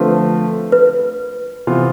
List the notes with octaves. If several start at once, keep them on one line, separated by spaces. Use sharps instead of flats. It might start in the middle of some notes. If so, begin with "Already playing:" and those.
Already playing: D3 F3 A3 C4 F4 B4
B4
C3 E3 B3 F4